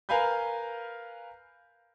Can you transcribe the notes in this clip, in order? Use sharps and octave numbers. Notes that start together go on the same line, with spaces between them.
A#4 B4 F5 G#5 B5 G6